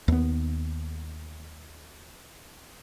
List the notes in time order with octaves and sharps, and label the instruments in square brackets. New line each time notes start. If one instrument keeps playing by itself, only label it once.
[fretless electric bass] D#2 B3